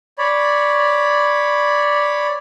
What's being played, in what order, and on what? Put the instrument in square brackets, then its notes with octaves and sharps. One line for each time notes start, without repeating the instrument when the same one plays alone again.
[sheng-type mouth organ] C#5 D5 B5